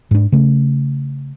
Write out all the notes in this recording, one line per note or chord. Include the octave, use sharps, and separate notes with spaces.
G#2 D4
C#3 A3